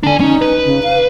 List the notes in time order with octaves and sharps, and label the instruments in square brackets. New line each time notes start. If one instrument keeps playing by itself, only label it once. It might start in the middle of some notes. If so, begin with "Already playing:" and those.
[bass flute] D3 [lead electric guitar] D4 G#5
[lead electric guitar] C#4 [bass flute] D#4
[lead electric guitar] B4
[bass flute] C#3
F5